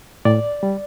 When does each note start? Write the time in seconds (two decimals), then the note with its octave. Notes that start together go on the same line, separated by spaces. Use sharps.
0.25 A2 D5
0.63 G3